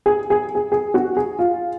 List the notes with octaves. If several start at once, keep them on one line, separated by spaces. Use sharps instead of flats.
G#4
G#4
G#4
G#4
F#4
G#4
F4